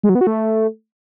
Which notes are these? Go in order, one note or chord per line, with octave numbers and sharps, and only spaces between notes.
G#3
F#3
B3
F#4
A3